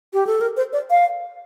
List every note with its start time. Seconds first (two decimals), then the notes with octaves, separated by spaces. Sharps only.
0.13 G4
0.27 A4
0.41 A#4
0.57 C5
0.73 D5
0.90 F5